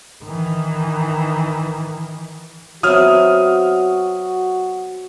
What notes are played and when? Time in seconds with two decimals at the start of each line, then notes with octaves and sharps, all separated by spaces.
0.24 D#3 E3
2.83 F#3 B3 C4 F#4 E5 D#6 F6